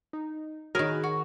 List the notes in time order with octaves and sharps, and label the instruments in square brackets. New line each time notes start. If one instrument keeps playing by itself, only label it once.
[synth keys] D#4
[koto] D#3 A#4 [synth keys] F#4 G#4 C#5 [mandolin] B4 G#5
[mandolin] F#4